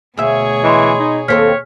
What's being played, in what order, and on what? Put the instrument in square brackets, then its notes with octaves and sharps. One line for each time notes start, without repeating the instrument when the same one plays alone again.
[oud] D2 E5 [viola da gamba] B2 G#4 C#5
[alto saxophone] E3 [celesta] D#5 B5 C6
[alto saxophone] D#4
[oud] D#2 C4 A4 [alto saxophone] C#5 [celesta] F6 B6